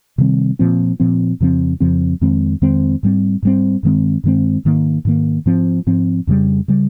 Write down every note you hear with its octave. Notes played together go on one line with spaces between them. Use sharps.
C3 D#3 G3 C4
A#2 F3 C4
A#2 F3 C4
F2 C#3 F3 C4
F2 C#3 F3 C4
F2 D#3 G#3 C4
F2 D#3 G#3 C4
G#2 G3 C4
G#2 G3 C4
G2 D#3 G#3 C4
G2 D#3 G#3 C4
G#2 D#3 A#3
G#2 D#3 A#3
G#2 F3 C4
G#2 F3 C4
F2 C#3 G3
C#3 G3